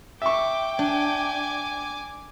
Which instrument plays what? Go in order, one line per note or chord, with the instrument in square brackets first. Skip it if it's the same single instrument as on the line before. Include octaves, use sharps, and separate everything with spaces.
[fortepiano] E5 C#6 [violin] G5 [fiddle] D6
[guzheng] D4 [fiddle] G#5 D6